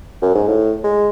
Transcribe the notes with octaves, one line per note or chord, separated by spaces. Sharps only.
F#2
G#2
A2
G#3